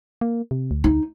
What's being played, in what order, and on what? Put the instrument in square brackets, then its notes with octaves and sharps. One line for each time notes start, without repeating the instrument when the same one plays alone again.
[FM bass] A#3
C3
D2
[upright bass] D#4